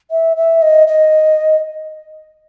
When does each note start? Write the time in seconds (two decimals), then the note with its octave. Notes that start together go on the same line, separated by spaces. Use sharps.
0.11 E5
0.37 E5
0.62 D#5
0.88 D#5